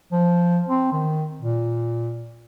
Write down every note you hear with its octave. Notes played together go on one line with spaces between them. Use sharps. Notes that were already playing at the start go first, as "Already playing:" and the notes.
F3
C4
D#3
A#2